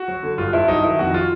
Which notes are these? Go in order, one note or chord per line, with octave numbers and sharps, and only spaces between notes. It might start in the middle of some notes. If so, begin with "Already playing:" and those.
Already playing: F#4
F#3
D3
G2 F4
G2 E4
F#3 D#4
D#3 E4
F2 F#4
F4